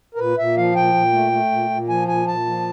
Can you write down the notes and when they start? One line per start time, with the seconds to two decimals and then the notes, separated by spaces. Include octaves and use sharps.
0.15 A#4
0.19 A#2 B4
0.38 A#2 E5
0.57 F3 F5
0.75 A#2 G5
0.94 A#2
1.13 A3
1.32 A3
1.52 A#2
1.70 A#2
1.89 F3 G#5
2.08 A#2 G#5
2.27 A#2 A5
2.46 F3